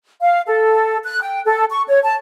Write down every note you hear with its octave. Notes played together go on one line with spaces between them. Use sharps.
F5
A4
F#6
G5
A4
C#6
C#5
A5